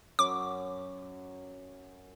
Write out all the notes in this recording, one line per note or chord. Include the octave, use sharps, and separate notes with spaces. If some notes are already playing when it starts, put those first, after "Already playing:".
F#2 D6